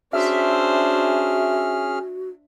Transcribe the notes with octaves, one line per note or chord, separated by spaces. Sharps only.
C#4 D4 F#4 G#4 C5 E5 F6